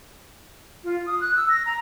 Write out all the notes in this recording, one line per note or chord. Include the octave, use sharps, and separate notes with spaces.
F4
D#6
F#6
E6
A#6
A#5